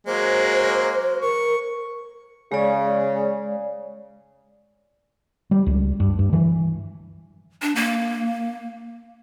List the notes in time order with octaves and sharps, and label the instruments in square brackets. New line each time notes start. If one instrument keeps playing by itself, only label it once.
[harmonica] F#3 G#3 A#3 [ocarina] C5
[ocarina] A#4 [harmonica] C#6
[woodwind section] C#3 [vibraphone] G#3 D5
[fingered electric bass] G3
C#2
G2
G2
E3
[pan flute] D4
A#3